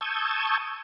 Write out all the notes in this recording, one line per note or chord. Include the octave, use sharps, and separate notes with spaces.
A5 C#6 D#6 E6 G6 G#6